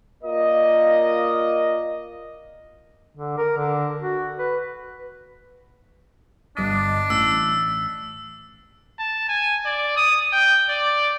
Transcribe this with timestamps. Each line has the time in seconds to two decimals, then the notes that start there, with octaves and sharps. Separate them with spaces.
0.23 A#3 F4 A#4 D5 D#5
3.17 D3
3.38 A#4
3.57 D3
4.02 F#4
4.39 B4
6.57 G1 G2 D4 D#5
7.10 A1 E6 B6
8.99 A5
9.29 G#5
9.65 D5
9.97 D#6
10.33 G5
10.70 D5